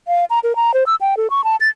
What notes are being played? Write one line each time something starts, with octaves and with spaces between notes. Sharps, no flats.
F5
A#5
A#4
A#5
C5
E6
G5
A4
C#6
A5
A6